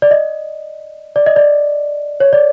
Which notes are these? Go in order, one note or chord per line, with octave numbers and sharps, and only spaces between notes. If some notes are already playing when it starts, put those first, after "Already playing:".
D5
D#5
D5
D#5
D5
C#5
D5